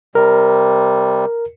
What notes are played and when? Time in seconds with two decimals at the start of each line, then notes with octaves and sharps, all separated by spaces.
0.15 C3 G3 A#4